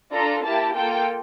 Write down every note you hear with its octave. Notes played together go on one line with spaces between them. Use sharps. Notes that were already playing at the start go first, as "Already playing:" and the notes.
D4 F4 A4 A#5
A#3 E4 G4 A5
A#3 F4 A4 G5